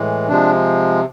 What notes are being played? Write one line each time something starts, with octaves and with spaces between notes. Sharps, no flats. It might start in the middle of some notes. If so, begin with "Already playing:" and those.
Already playing: A2 E3 G#3
C3 F3 G#3 D4